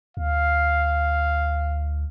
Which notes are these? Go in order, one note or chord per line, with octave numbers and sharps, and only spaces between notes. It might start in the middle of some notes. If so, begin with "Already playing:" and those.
D2 F5